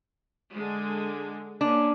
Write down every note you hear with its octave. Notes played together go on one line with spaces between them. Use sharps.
D3 G#3
A#3 C#4 D4